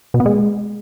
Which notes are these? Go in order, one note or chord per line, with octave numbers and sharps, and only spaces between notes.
B2
B3
G#3